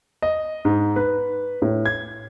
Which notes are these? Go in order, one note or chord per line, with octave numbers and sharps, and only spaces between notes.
D#5
G#2
B4
A2
G#6